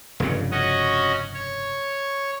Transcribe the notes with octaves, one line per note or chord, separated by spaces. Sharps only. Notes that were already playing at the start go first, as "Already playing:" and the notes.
F1 G2 C#3
C#4 F#4 D#5
C#5